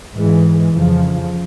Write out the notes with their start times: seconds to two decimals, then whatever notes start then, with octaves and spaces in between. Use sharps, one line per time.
0.16 G#2 E3 G#3
0.74 F2 C#3 F3